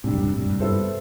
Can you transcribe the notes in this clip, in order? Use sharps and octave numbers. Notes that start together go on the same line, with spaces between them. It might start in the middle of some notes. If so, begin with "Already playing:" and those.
A2 C3 G3 D4
F#2
G2
A2
G2
G2 B3 E4 A4 C5